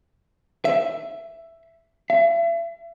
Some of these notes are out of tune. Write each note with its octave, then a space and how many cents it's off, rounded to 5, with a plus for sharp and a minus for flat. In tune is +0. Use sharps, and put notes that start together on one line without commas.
E5 +10
E5 +40